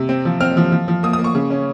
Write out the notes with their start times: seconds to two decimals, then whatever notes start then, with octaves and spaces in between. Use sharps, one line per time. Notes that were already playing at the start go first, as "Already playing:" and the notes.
Already playing: C3
0.09 C4
0.25 F3
0.41 C4 F6
0.57 F3
0.72 F3
0.88 F3
1.03 A#3 D#6
1.13 D#6
1.19 A#3
1.24 C#6
1.35 C#3
1.50 C#4